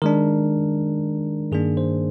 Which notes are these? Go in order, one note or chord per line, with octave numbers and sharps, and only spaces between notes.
D#3 G#3 D4 A#4
G2 D#3 A#3 D4 G#4
C5